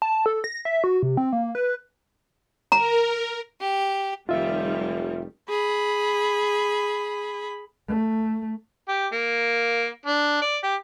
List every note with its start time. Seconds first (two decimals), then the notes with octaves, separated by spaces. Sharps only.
0.02 A5
0.26 A4
0.44 A#6
0.65 E5
0.84 F#4
1.02 C3
1.17 C4
1.33 A#3
1.55 B4
2.72 A#4 A#5
3.60 G4
4.29 F1 D#3 G3 F4 E5
5.49 G#4 B5
7.88 A3
8.89 G4
9.13 A#3
10.06 D4
10.42 D5
10.64 G4